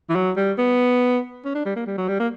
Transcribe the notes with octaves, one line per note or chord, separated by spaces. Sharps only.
E3
F#3
G3
B3
C#4
D4
G3
A#3
G3
F#3
G3
A#3